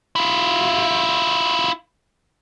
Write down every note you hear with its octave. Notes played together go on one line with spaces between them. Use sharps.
E4 F4